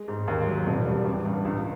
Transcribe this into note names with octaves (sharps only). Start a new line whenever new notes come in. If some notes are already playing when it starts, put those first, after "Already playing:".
Already playing: G#3
G#2
D#2
F#3
E1
G3
A1
G2
C#2